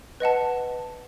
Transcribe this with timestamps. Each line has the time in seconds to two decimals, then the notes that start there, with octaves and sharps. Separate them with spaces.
0.20 B4 D#5 F#5 A5